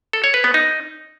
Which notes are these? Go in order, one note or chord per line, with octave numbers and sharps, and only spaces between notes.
A4
C#5
B4
B3
D#4